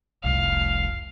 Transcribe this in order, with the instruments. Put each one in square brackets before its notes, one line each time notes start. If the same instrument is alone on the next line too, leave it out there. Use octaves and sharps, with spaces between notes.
[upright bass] F1 C2 [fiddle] F5